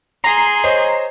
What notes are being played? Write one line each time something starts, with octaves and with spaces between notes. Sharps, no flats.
G#4 A#5 C6 C7
C5 C#5 D#5